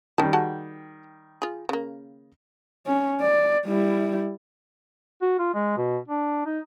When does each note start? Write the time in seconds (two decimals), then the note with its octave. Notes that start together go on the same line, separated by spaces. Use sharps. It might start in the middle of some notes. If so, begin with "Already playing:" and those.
0.18 D#3 G3 C#4 A5
0.33 F#4 G#4 A5
1.42 F4 G#4
1.69 C#3 A#3
2.86 C#4
3.21 D5
3.66 G3 E4
5.22 F#4
5.39 F4
5.54 G#3
5.77 B2
6.08 D4
6.46 D#4